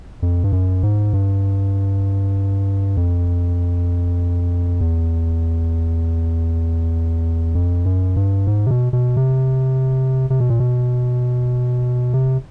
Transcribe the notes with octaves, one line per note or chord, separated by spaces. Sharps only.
F2
G2
F#2
G#2
G2
F2
E2
F2
F#2
G2
G#2
C3
B2
B2
C3
C3
B2
A#2
B2
C3